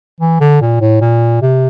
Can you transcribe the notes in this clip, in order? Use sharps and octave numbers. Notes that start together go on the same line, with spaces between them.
E3
D3
A#2
A2
A#2
C3